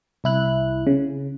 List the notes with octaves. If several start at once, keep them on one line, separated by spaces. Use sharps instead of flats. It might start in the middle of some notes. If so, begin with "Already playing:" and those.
C2 E4 F#6
C#3